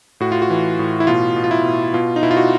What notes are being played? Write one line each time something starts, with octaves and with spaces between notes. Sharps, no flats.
A2 F#4
F4
F#4
E3
A2
E4
B2 F4
B2
F4
E4
B2
B2 F4
D#4
B2 E4
F4
F#4